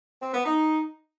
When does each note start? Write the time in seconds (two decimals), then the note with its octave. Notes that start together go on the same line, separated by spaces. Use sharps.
0.22 C4
0.33 B3
0.44 D#4